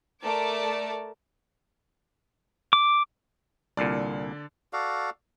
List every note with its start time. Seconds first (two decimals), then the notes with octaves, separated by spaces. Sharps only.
0.23 A3 A#4 D5 A5 D6
2.73 D6
3.77 C2 A#2 D3 D5
4.73 F#4 A4 D5 F5